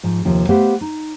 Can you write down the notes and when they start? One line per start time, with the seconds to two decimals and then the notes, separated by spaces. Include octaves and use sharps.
0.03 G#2 F3
0.25 D#2 C3 F3
0.49 A3 B3 G4 B4 C5 F5
0.81 D#4